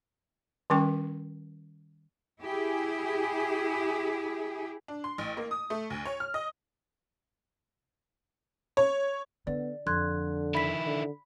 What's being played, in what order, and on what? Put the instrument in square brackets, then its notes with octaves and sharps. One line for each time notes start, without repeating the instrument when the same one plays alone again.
[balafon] D#3 G3 C#4 A#4 G5 C#6
[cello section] E4 G4 G#4
[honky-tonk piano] D4
C6
A1
A#3
D#6
A3
D2
C#5
F6
D#5
C#5
[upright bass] D3 [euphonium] B3 [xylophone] D5
[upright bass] F2 [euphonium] D3 [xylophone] C6 F#6 G#6
[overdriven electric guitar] D#3 E4 [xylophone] B5 B6
[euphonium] D3